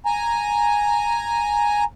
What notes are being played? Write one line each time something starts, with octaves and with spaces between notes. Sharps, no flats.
G#5 A#5